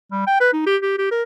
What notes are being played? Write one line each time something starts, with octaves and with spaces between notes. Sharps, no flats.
G3
G5
B4
D#4
G4
G4
G4
A#4